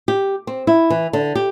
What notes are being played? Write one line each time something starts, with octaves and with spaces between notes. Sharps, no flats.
G4
C4
E4
E3
D3
G4